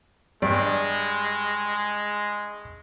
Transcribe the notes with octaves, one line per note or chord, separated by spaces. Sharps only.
G2 G#3 D5